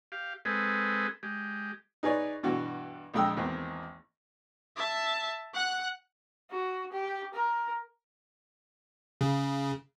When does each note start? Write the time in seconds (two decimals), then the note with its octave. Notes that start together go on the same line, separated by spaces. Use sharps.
0.12 G4 F5
0.45 G#3 C4 G#4 A4 B4
1.23 G#3 G4
2.03 D#4 G#4 B4 C#5 D5
2.43 G2 B2 E3 F#4
3.14 A#1 F2 G#3 G5 D#6 E6
3.36 G#1 E2 A#3 C4
4.77 E5 A5
5.54 F#5 F#6
6.51 F#4
6.92 G4
7.34 A#4
9.21 C#3